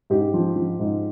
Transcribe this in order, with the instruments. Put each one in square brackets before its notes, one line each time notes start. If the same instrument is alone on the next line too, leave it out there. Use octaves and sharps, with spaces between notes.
[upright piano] G#2 G4
F3
F3
G#2